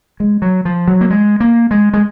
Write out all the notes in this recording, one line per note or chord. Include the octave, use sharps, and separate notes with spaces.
G#3
F#3
F3
F#3
A#3
G#3
A#3
G#3
G#3